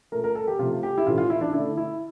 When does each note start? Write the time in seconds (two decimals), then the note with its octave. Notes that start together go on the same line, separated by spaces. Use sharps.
0.12 A#2 A3 A#4
0.24 A#4
0.35 A4
0.47 G4
0.59 C3 F3 A3 F4
0.83 G4
0.98 E4
1.06 A2 E3 A3 F4
1.18 F4
1.30 E4
1.41 D4
1.53 D3 A3 E4
1.77 E4